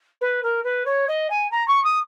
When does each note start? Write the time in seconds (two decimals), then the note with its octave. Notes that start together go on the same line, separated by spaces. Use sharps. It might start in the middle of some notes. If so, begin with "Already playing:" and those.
0.21 B4
0.43 A#4
0.64 B4
0.85 C#5
1.08 D#5
1.30 G#5
1.51 A#5
1.67 C#6
1.84 D#6